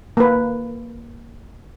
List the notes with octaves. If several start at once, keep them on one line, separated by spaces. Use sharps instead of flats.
A#3 B4